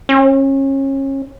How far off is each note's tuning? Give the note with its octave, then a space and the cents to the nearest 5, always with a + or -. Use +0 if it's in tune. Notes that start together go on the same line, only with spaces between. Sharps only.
C#4 -30